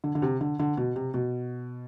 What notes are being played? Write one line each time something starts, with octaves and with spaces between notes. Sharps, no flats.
D3
D3
C3
D3
D3
B2
C3
B2